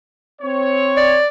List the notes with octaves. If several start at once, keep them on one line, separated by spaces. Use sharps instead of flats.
C4 C#5
D5